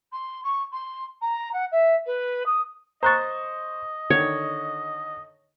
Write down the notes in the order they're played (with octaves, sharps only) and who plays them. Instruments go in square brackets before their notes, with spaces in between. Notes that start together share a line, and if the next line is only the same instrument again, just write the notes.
[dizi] C6
C#6
C6
A#5
F#5
E5
B4
D#6
[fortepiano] C5 C6 C#6 [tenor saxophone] D#5 [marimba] A#5 F#6 A6
[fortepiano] D3 D#3 [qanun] C#5